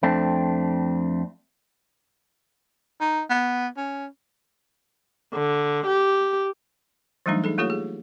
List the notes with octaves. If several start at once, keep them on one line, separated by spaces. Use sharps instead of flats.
F2 A3 C4 D4
D#4
B3
C#4
D3
G4
E3 F#3 G3 A3 D4 D#4
D#4 G#4 A4
A3 A#3 F4 G4 A4 C#5
G#4